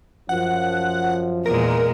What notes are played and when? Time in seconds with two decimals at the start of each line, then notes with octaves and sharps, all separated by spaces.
0.29 F#2 F3 F#5
1.46 E2 A#2 G#3 A#4